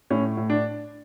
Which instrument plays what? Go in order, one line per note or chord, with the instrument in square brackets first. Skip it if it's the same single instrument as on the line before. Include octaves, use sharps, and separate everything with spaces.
[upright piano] A2 C#4
A2
D4